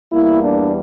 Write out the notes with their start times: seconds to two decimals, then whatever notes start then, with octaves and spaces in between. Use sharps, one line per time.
0.12 E2 E3 G3 A#3 E4
0.43 D4